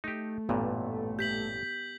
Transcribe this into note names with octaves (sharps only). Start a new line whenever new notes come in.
A3 D#4 G4
A1 G2 A#2 B3
G4 G6 B6 F#7